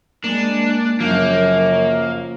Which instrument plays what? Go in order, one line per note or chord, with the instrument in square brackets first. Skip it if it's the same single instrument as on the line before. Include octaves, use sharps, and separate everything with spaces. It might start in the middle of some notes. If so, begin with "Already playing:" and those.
[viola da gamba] G#3 [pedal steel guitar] A#3 [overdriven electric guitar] D4
[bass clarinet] F#2 [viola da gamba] C#3 F#3 [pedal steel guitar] F3 G6 [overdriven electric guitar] A#3